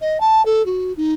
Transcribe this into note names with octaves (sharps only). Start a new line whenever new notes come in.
D#5
A5
A4
F#4
D#4